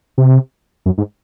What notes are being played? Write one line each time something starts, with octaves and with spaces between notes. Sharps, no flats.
C3
F#2
G#2